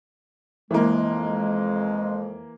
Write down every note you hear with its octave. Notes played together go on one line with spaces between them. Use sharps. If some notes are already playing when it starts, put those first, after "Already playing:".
F2 E3 G#3 A#3